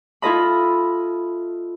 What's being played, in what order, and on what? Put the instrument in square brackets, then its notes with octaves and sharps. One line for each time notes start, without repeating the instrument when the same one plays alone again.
[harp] E4 F4 A4 D#5 B5